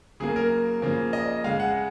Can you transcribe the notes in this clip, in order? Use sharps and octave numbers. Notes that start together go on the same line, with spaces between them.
C#3 F#3 A#3 G#4
A#4
C#3 F3 A#3
D#5
C#3 G#3 F5
F#5